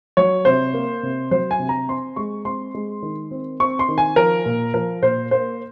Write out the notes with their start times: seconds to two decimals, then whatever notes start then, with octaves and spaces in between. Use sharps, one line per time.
0.17 F#3 C#5
0.45 C3 C5
0.74 A#3
1.03 C3
1.31 F#3 C5
1.51 G#5
1.59 C3
1.69 A#5
1.88 C4 C6
2.16 G#3 C#6
2.45 C4 C6
2.74 G#3
3.03 D#3
3.31 C4
3.60 C4 C#6
3.79 C6
3.89 D#3
3.98 G#5
4.16 F3 A#4
4.46 A#2
4.74 F3 A#4
5.02 A#2 C5
5.31 A#3 C5